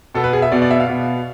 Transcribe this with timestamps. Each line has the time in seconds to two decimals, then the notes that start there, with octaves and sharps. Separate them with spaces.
0.15 B2 B3 A4
0.24 B4
0.33 G#4
0.42 E5
0.52 B2 B3 D5
0.62 D5
0.71 E5
0.80 F5
0.89 B2 B3